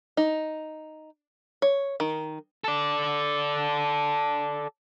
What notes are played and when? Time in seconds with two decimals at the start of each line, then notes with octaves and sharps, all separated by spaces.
0.17 D#4
1.62 C#5
2.00 D#3
2.64 A4 D5